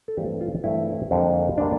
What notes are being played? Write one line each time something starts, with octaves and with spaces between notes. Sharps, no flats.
A4
G2 E3 A3 C4 G4
F4
G2 E3 A3 C4 E4
F2 D3 G3 A#3
D3 G3 A#3 D4